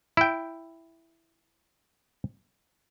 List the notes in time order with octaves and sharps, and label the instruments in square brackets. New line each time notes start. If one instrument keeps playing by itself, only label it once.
[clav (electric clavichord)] E4 G5